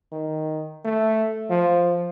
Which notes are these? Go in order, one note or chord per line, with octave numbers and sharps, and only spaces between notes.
D#3
A3
F3